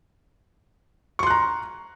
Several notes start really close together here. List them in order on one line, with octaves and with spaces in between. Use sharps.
C#6 C6 F#6 A#5